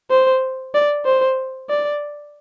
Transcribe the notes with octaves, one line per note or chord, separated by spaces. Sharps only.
C5
D5
C5
D5